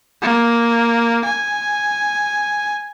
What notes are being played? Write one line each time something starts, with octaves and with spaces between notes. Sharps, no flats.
A#3
G#5